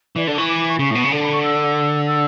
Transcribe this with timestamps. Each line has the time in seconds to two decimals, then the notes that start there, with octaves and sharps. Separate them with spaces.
0.16 E3 D5
0.27 D3 D5
0.33 D6
0.37 E3 C#6
0.48 D6
0.59 D6
0.68 C#6
0.79 C#3 C#6
0.90 A2
0.95 B2
1.04 C#3
1.11 D3 A5
1.22 B5
1.32 C#6
1.43 E6
2.06 E6